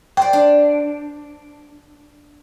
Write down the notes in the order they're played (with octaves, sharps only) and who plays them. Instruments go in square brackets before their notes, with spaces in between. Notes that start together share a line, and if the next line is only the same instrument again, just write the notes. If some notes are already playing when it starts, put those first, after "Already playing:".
[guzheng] C5 D5 [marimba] G5
[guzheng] D4